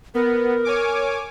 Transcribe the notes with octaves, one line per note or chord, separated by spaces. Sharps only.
B3 A#4
C#5 G#5 D6